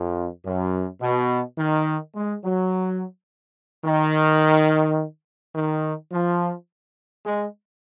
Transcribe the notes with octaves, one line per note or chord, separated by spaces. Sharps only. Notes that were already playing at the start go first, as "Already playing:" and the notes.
Already playing: F2
F#2
B2
D#3
G#3
F#3
D#3
D#3
F3
G#3